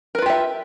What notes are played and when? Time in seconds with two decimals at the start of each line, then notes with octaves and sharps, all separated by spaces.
0.15 A#4
0.18 B4
0.22 F4
0.26 G4
0.30 E5